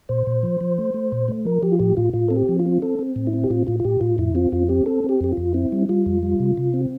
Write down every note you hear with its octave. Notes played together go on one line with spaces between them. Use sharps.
A#2 C5
A#2
F3
F3
A3
A3
A#2
A3
F3 A#4
F3 G4
F4
A2 G4
A2 F4
A2 F4
C4 A4
G4
F3
F4
C4
C4 A4
C4
A2
E4
C4
G4
A2 F4
A2 F4
F4
A2 G4
A2 F4
F2 E4
C4 F4
F2 F4
C4 G4
C4 A4
C4 G4
F2 G4
F2 F4
C4 E4
G3
G3 F4
F2
G3
C3
C3
C4